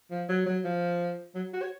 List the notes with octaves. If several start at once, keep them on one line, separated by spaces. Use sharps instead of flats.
F3
F#3
F#3
F3
F#3
F#4
C#5